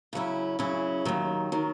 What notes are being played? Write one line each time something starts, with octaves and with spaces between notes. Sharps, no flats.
C#3 F#3 C#4 E4
C#3 F#3 C#4 E4
D#2 D#3 F#3
D#3 F#3